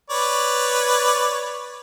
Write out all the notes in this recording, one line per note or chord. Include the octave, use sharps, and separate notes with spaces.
B4 C#5 D5